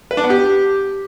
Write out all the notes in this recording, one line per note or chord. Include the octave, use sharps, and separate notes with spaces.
B4
D4
B3
G4